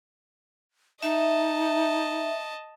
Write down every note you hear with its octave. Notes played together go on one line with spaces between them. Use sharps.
D#4 D#5 E5 A5